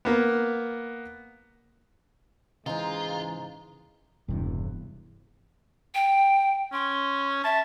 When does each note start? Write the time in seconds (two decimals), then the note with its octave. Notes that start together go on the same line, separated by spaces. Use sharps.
0.05 A#3 B3
2.66 G#2 C#3 E3 G#3 D#4 F4
4.29 E1 G2 C3 E3
5.95 G5
6.73 C#4 C6
7.44 E5 A5